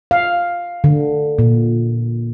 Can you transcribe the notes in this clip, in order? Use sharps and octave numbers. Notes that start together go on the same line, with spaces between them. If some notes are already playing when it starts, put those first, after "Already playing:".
F5
D3
A#2